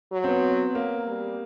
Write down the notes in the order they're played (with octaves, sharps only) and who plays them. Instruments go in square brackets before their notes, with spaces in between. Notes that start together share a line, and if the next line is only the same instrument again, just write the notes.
[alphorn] F#3
[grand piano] C4
B3
A#3
[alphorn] G3